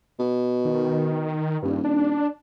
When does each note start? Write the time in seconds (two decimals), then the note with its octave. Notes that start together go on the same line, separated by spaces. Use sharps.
0.19 B2
0.65 D#3
1.63 D#1 G2
1.84 D4